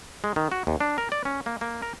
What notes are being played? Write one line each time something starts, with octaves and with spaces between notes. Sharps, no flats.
G#3
D#3
F#4
D#2
D4
A#4
D5
C#4
A#3
A#3
A#4